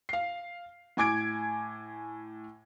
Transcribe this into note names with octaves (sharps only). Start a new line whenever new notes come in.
F5 C7
A2 G#5 D6 G#6 D7